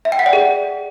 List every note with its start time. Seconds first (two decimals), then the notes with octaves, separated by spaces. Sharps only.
0.05 E5
0.12 G5
0.19 F#5
0.26 D5
0.33 G#4